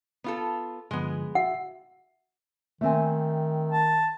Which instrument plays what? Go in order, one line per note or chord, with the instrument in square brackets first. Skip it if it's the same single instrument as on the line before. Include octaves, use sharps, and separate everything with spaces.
[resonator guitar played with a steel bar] B3 F4 A4
[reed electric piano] G2 D3 F3 [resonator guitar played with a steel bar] G#3 B3
[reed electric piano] F#4 E5 [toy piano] F#5
[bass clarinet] D#3 [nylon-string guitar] A3 C4 G#5
[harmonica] A5